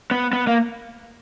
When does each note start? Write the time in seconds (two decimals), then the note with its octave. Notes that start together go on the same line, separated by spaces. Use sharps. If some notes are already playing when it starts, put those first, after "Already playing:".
0.11 B3
0.33 B3
0.47 A#3